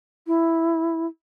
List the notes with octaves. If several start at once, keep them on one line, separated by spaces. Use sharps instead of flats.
E4